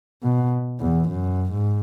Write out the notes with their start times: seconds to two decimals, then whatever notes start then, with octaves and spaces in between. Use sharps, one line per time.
0.23 B2
0.80 E2
1.09 F#2
1.53 G#2